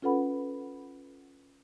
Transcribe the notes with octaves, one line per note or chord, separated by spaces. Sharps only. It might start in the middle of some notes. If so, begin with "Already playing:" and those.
C#4 F4 A4 B4 F#5 B5